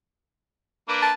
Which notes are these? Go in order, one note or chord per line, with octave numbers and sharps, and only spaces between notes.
A#3 D4 B4
A5